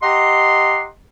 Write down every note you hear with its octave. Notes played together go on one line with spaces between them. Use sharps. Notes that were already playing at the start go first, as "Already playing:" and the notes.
G4 D#5 F#5 A#5 C6